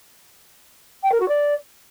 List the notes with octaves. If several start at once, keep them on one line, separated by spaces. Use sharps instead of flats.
G5
A#4
F#4
D5